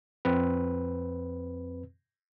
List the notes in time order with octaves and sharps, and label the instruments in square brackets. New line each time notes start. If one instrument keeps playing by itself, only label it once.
[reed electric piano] F2 C4 B4